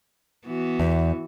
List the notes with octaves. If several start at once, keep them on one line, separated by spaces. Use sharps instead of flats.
E3 B3 F#4
E2